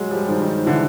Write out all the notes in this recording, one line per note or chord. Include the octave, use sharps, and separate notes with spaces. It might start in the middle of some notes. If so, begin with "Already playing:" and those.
Already playing: F#3 G#3
F3 G3
D#3 F3
D#3 F3
D3 E3